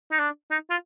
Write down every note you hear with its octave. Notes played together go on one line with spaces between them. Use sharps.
D#4
D4
D#4
F4